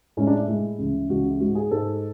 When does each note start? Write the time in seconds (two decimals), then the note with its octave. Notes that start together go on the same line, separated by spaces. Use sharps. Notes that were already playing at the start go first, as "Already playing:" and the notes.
0.17 A2 G#3 C#4
0.27 D4
0.38 E4
0.48 A2 G#3
0.79 C#2 C#3 E3
1.09 C#2 C#3 E3 F#4
1.25 E4
1.40 G#2 G#3 F#4
1.55 G#4
1.71 G#2 G#3 A4